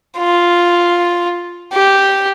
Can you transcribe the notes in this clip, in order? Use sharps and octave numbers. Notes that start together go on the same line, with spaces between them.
F4
G4